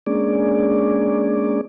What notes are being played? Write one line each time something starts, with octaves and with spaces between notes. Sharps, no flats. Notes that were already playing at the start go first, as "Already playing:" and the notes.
G#3 A#3 C#4 D4 G#4 D5